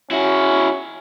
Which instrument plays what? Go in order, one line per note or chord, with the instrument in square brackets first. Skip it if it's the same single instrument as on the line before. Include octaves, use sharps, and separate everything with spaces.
[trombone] C#4 [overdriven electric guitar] E4 F#4